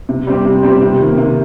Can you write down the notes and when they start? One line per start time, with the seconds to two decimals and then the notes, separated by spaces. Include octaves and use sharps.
0.09 C3
0.27 G3 C4 G4
0.45 C3
0.63 G3 C4 G4
0.82 C3
1.00 D#3 A#3
1.18 C3